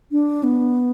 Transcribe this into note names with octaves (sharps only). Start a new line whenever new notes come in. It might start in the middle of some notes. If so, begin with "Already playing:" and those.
D4
B3